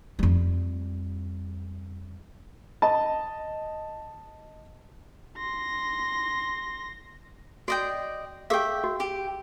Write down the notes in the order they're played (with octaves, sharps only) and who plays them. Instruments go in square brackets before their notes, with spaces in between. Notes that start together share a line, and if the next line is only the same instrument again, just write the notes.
[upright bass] F2 G3
[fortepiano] D#5 A5
[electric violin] C6 A#6
[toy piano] F#4 [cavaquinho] D5 D#5 G5
[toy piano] G4 G#4 F5 [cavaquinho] E5 G5
[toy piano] F#4
[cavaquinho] G4